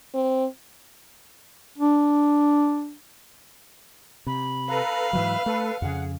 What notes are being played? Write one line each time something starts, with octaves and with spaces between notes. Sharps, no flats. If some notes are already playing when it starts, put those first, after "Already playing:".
C4
D4
C3 B5
A4 B4 F5 A#5
G#2 E3 F#3 B4 E5
A3 A4 B4
F2 C#3 G#4 F#5